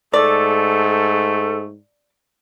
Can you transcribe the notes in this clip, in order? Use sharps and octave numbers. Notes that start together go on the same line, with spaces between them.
G#2 A3 A4 D5